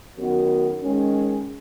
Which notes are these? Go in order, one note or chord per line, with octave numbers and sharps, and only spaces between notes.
F#2 D#3 B3 F#4
D#3 G#3 C#4